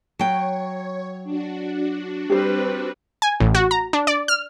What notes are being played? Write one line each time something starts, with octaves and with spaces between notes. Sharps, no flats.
F#3 C#5 G5
D4 F#4
G3 C4 G4 B4 C5
G#5
A1
F#4
A#5
D4
D5
F6